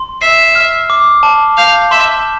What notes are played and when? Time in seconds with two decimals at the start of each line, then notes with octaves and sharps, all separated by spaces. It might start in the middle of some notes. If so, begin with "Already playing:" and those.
Already playing: C6
0.22 E5 C7
0.55 F6
0.90 D6
1.23 A5
1.57 F5 G6
1.91 E5 C6